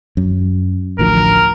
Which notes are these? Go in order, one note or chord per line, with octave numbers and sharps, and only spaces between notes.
F#2
A1 D2 F3 A#4